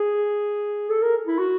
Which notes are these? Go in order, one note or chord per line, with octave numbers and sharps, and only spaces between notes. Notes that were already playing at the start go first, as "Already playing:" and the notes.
Already playing: G#4
A4
A#4
E4
F#4